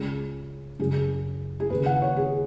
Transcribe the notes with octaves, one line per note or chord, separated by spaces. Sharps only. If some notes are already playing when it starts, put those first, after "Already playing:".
Already playing: C#2 C#3 G#4
F#2 C#3 G#4
G#4
D#2 C#3 B4
F#5
C#5
G#4